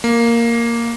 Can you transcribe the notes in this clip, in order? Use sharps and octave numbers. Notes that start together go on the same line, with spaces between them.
A#3